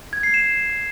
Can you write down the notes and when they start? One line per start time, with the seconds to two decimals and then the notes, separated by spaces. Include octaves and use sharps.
0.13 G#6
0.23 C7
0.34 E7